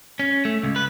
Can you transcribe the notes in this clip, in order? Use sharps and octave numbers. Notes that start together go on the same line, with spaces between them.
C#4
A3
C#2
B4